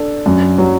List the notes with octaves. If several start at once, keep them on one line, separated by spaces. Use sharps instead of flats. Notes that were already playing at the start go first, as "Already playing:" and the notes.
Already playing: D4 A4
F#2
F#3